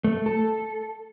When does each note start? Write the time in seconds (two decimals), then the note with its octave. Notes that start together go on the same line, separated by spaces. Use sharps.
0.04 A3
0.26 A4